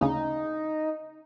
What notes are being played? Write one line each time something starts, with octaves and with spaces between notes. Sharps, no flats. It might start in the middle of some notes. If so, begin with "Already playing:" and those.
D2 C#3 D#4